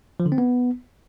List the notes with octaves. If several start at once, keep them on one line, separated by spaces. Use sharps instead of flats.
F3
D3
C4
B3